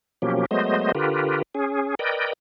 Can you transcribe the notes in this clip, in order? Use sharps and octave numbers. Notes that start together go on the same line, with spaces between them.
B2 F3 F#3 A#3 C#4 G4
F#3 G#3 A3 B3 C5 D#5
D3 F4 G4 A#4 B4
C#4 G#4
A#4 B4 D5 D#5 G5